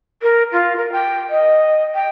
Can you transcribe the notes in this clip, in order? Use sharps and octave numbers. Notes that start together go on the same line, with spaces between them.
A#4
F4
A#4
G5
D#5
G5